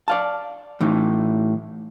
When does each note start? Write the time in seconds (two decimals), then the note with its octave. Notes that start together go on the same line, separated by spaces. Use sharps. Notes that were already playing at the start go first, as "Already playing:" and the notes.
0.08 D5 F5 A5
0.81 A2 E3 D#4